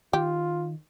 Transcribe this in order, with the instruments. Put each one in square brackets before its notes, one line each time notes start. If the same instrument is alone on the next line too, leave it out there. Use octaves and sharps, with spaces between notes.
[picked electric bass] D#3 [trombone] F4 [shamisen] G4